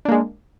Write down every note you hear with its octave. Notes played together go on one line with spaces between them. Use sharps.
G#3 A#3 D4